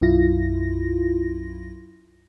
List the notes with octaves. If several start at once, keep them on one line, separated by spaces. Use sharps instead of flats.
B1 F#2 E4 F4 A#6